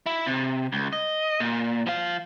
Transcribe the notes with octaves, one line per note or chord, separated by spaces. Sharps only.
E4
C3
C#2
D#5
A#2
F3 F5